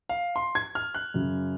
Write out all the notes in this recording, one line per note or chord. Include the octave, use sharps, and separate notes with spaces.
F5
C6
G#6
F6
F#6
F#2 C#3 F#3